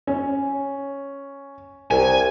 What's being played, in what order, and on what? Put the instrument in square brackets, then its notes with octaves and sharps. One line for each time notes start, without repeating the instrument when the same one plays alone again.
[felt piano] C#4
[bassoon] C2 [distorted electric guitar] G#5